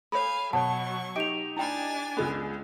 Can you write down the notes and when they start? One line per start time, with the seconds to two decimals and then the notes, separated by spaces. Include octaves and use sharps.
0.12 A4 C#5 F5 G#5 B5
0.53 B2 F#3 C#5 F#5 A5 C#6
1.16 D#4 G4 D#5 D7 F7
1.57 D4 E4 G5 G#5 B5 A6
2.17 C#2 G#3 B3